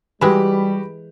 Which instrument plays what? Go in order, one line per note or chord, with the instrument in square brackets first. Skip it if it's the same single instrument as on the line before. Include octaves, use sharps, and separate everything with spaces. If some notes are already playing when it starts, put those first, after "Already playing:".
[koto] E3 G#3 [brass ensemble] G3 [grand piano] F#4 G4 B5